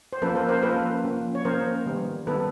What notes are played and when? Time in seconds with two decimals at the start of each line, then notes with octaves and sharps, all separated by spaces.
0.13 C5
0.22 F3 A#3 C#4 A4 B4
0.35 A#4 C5
0.49 A#4 C5
0.63 F3 A#3 C#4 A4 B4
1.04 F3 A#3 C#4
1.35 C#5
1.45 F3 A#3 C#4 A#4 C5
1.86 D#3 G3 B3
2.27 D#3 G3 B3 A4 B4